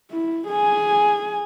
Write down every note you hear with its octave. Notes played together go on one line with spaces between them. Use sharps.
E4
G#4 G#5